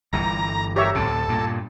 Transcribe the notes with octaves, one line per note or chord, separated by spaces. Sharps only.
G1 G2 E3 A#5
G4 A#4 C#5 E5
D2 A2 C3 A4
G2 A#2